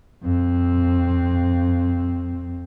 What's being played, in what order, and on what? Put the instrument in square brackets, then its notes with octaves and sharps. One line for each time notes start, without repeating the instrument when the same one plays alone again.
[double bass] F2 C4